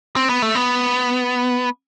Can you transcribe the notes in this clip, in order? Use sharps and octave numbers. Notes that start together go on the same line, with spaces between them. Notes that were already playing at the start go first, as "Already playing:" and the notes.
C4
B3
A3
B3